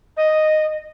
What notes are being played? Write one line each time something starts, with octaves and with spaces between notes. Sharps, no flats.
D#5